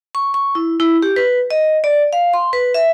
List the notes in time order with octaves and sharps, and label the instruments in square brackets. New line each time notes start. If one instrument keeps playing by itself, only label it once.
[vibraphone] C#6
C#6
E4
E4
G4
B4
D#5
D5
F5
C6
B4
E5